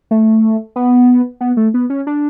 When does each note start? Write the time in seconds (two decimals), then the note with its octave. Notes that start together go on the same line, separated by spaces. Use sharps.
0.11 A3
0.76 B3
1.41 B3
1.57 A3
1.74 B3
1.90 C#4
2.07 D4